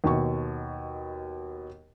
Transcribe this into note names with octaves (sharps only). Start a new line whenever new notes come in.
D#2 B2 C#6